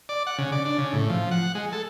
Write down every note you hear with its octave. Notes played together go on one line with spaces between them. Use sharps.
D5
F#5
C#3
D5
D4
C#3
A2
F3
F#5
G#3
A4